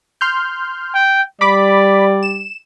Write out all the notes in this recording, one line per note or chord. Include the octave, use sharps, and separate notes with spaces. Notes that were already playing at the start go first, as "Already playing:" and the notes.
C6 F6 G6
G5
G3 D5 B5 D6 B6
E7